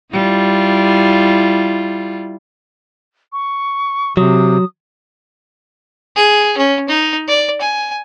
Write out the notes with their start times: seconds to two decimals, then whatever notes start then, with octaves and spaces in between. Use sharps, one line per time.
0.13 G3 E4 F4
3.33 C#6
4.17 C3 F#3 D#6
6.16 G#4
6.57 C#4
6.88 D#4
7.28 D5
7.61 G#5